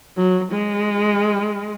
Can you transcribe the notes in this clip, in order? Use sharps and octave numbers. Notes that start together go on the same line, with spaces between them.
F#3
G#3